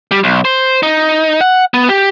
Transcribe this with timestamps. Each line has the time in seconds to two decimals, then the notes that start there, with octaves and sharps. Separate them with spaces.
0.11 G3
0.24 B1
0.45 C5
0.83 D#4
1.41 F#5
1.74 B3
1.89 G4